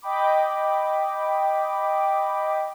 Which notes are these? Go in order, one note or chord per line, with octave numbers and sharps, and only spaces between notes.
D#5 G5 B5 D6